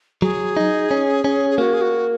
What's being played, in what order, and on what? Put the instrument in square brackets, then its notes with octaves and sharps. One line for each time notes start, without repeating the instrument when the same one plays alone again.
[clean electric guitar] F#3 [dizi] G#4
[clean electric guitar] D#4
C#4
C#4
[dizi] G#4
[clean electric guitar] A#3 [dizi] F#4
[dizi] G#4
F#4